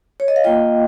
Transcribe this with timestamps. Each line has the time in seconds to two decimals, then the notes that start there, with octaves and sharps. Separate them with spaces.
0.20 C#5
0.28 D#5
0.36 F5
0.44 A#3 F4 D#5 G5